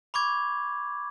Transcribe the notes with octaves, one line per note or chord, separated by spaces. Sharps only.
B5 C#6 D6 G#6